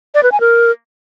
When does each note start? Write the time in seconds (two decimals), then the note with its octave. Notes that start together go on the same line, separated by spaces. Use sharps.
0.15 D5
0.23 B4
0.32 G#5
0.40 A#4